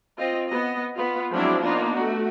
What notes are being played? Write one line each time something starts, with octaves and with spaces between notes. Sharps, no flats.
C4 F4 D#5
B3 D#5
B3 F4
F3 F#3 G#3 C4 D4 E4
A#3 B3 D4 D#4 F4
A3 F#4